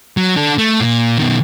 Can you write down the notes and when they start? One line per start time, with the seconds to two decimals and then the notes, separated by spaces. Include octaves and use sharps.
0.17 F#3
0.36 D4 A4
0.58 A3
0.80 A#2
1.18 B2 D#3